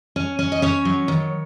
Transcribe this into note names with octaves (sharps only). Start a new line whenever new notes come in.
C#4
C#4
D#5
C#4 C#5
F#3
D#3